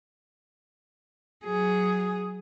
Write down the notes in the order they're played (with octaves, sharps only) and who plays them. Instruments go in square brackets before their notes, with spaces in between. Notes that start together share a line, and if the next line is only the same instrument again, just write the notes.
[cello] F#3 G#4